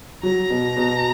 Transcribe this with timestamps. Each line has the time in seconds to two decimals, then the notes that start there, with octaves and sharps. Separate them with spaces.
0.23 F#3 A#5
0.50 B2
0.76 B2